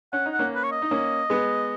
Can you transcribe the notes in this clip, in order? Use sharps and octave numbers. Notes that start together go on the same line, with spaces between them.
C#4 F#5
D#4
F#5
A#3 C#4
B4
C#5
D#5
D#4
A#3 C#4
G#3 B3